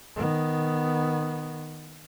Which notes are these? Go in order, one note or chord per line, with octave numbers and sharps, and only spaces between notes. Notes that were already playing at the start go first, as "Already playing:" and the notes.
D#3 B3